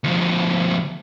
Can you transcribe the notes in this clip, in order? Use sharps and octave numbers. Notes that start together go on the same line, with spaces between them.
D2 F3